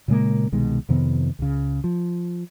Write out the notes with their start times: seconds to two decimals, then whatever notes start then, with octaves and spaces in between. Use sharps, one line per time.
0.08 A#2 C#3 G#3 A#3
0.52 C2 B2 D#3 G#3
0.89 F2 C3 D#3 B3
1.39 C#2 C#3
1.84 F3